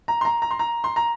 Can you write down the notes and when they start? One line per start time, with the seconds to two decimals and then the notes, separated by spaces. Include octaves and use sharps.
0.08 A#5
0.21 C6
0.25 A#5
0.42 A#5
0.51 C6
0.59 A#5
0.84 C6
0.96 A#5